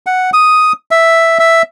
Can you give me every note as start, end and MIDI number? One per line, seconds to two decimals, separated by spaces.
0.06 0.30 78
0.33 0.72 87
0.91 1.38 76
1.39 1.62 76